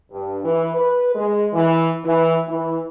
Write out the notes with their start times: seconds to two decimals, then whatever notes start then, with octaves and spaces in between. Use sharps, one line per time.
0.11 G2
0.44 E3
0.75 B4
1.15 G#3
1.54 E3
2.04 E3
2.47 E3